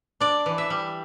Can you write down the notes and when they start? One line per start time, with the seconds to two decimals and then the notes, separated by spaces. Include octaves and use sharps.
0.21 D4 D5
0.46 E3
0.58 E5
0.70 G3